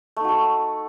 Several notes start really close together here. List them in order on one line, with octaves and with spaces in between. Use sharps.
A3 D#4 F#4 A4